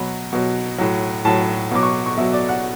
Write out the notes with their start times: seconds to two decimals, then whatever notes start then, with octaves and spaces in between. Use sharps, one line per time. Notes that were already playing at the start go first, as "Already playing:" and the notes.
Already playing: B2 F#3 B5
0.33 B2 F#3
0.78 A2 F#3
1.25 A2 F#3 A5
1.71 B2 F#3 D6
1.83 C#6
2.06 C#6
2.17 B2 F#3 E5
2.33 D5
2.49 F#5